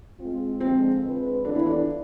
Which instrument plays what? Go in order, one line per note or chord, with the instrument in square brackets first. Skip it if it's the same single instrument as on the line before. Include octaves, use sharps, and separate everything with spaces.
[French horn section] G#3 C4 F4
[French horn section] D3 F3 G#3 [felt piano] C4
[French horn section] D3 G#3 C4 F4 B4
[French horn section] E3 B3 F4 A4 [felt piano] D4
[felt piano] E4
D4